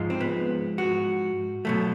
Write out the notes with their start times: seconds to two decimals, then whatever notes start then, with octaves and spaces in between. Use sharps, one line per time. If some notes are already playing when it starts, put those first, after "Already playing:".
Already playing: G#2 F3 G#3
0.10 C4
0.21 B3
0.78 F#4
1.65 B2 F#3 A3